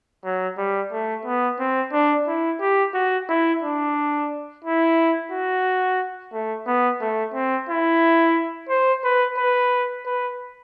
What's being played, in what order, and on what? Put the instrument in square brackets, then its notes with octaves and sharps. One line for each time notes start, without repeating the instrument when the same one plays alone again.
[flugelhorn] F#3
G3
A3
B3
C4
D4
E4
G4
F#4
E4
D4
E4
F#4
A3
B3
A3
C4
E4
C5
B4
B4
B4